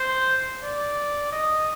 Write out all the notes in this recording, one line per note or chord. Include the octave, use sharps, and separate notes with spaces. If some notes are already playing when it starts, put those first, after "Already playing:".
Already playing: C5
D5
D#5